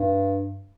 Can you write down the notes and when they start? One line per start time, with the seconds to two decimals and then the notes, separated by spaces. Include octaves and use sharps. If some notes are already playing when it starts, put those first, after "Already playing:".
Already playing: G2